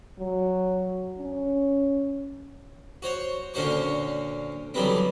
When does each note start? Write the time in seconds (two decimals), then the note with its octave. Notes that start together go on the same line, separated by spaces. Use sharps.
0.19 F#3
1.18 C#4
3.02 F#4 C5 C#5
3.54 A#2 D3 C#4 F#4 C5 C#6
4.74 D3 E3 F#3 G3 B3 C4